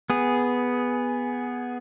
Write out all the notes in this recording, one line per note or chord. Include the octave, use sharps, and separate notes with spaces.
B3 G#4